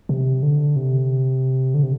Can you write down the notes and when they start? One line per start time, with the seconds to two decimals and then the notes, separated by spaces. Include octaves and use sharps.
0.09 C3
0.43 D3
0.76 C3
1.74 D3
1.83 C3